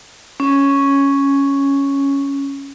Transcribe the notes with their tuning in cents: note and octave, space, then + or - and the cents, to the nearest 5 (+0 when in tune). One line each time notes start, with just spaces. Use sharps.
C#4 +0